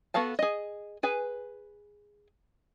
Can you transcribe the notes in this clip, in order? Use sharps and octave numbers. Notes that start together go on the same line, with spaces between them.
B3 F#4 A4 F5 A5
G#4 D#5
G#4 B4 G#5